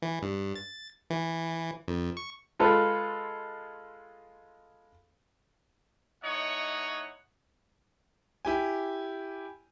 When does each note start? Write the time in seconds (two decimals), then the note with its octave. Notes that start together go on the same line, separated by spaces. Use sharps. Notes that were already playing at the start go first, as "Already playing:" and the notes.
0.02 E3
0.22 G2
0.56 A6
1.10 E3
1.88 F2
2.17 C#6
2.59 G#3 F4 A4 B4
6.23 A3 D#4 E4 C#5 D#5 F#5
8.45 E4 G4 G#5